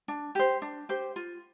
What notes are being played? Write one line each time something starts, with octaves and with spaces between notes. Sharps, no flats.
D4
G4 C5
D4
G4 C5
F4